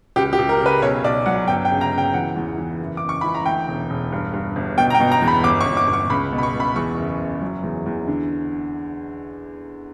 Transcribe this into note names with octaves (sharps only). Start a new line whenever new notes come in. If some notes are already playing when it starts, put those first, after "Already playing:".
C#2 G4
G4
C#2
A#4
C#3 B4
B1 C#5
B1 D5
F#3 F#5
G1 G5
G5
C#3
A#5
C#3
G5
E3 F#5
E2
E3
F#1
F#1 D6
C#6
E3 B5
A#5
D2 G5
E1
E1
G2
G2
G1
B2 G5
A#5
G5
B2
A#5
E2
B5
G1 D6
C#6
G1
D6
G1
C#6
C#2 B5
B2
B5
C#6
B2
B5
E2 C#6
F#1
F#1
F#3
E2
E2
D3